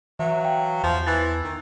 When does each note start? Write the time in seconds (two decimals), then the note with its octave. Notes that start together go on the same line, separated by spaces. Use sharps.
0.19 E3 F#3 E5
0.41 F5 G5
0.83 E2 F3
1.07 E3 E6 A6
1.44 D#3